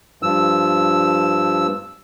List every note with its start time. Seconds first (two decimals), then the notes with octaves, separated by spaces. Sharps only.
0.23 G2 F3 E6